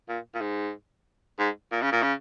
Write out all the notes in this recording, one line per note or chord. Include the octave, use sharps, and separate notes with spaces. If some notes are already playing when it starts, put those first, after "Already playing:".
A#2
A#2
G#2
G#2
A#2
C#3
A#2
C#3